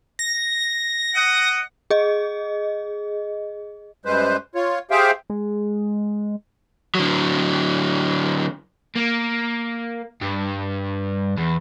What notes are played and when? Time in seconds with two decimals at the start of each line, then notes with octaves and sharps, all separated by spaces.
0.19 A#6
1.15 D#5 F#5
1.90 G#4 D#5
4.05 F#2 G3 G#3 B4 C5
4.55 F4 C#5
4.91 G4 G#4 C5 E5 F5 G5
5.30 G#3
6.95 D3 F#3
8.95 A#3
10.21 G2
11.38 E2